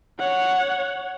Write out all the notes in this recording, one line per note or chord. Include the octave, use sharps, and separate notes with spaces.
C#5 F#5